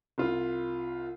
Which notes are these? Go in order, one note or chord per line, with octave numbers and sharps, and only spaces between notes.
C2 F4